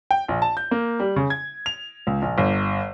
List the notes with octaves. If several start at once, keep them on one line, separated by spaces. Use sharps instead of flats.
G5
A#1
A5
G6
A#3
G3
C#3
G#6
F7
C#2
A#1
G1